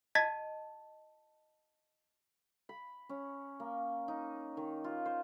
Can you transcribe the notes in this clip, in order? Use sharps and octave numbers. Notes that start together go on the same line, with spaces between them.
D#5 A5 G#6 A6 B6
B5
C#4
A#3
D#4
D#3
F4
C5